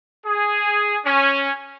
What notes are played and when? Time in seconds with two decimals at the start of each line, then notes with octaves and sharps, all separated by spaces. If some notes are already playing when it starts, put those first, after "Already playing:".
0.25 G#4
1.05 C#4